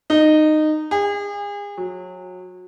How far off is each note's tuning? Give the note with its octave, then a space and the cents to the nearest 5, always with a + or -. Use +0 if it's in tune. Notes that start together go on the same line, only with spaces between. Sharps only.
D#4 -15
G#4 -35
F#3 -25